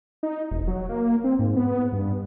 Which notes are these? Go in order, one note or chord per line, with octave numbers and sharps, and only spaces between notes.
D#4
E1
F#3
A#3
C4
G#2
B3
G2